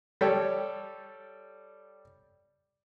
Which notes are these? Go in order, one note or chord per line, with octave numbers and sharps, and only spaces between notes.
G3 A4 C#5 G5